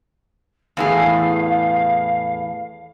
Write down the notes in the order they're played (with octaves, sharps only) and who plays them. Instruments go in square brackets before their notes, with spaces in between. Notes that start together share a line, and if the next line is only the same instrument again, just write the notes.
[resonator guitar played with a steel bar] E2 A2 G#4 [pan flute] F5